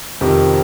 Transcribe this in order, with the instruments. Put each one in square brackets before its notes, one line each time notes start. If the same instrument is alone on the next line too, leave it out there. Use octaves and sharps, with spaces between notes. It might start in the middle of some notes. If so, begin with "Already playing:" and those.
[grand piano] F2 C3 D#3